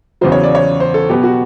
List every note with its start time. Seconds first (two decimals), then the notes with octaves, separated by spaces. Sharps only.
0.21 E2 C#3 F#3 C5
0.32 C#5
0.43 D5
0.55 C#5
0.80 C5
0.94 A4
1.09 B2 F#3 B3 G4
1.24 F#4